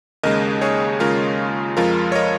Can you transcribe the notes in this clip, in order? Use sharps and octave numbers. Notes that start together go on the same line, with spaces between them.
D#2 C#3 G#3 A#4 D#5
G#4 C#5
D#2 C#3 G#3 F4 A#4
F2 F3 G#3 F4 A#4
C#5
A#4 D#5